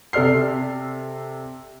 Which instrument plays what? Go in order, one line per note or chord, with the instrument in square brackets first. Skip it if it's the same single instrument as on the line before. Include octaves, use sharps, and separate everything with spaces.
[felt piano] C3 A4 D5 F6 C7